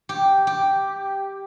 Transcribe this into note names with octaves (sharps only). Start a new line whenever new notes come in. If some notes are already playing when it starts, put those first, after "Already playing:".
G4
G4